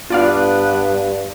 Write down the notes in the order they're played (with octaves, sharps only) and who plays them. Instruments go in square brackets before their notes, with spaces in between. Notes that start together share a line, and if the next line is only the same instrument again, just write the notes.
[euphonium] G2 [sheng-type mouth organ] B3 D4 [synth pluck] F4 D5 F5